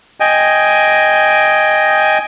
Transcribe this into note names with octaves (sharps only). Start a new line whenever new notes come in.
D#5 G5 G#5